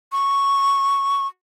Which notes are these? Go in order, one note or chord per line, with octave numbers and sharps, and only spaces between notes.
C#6